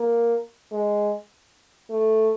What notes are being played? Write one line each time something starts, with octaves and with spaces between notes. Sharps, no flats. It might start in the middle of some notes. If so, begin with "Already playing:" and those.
Already playing: A#3
G#3
A3